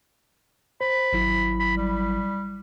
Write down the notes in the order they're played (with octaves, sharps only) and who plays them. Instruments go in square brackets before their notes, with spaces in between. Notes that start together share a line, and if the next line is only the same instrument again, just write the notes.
[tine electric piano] C5 [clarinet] B5
[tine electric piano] G#1 F#3 E4
[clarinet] B5
G3